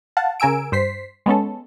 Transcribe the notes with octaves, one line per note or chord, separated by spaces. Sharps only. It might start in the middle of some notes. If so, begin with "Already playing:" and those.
F5 F#5 A5
C#3 A#4 G#5 E6 D7
G2 C5 B6 C7
G#3 B3 C#4 A4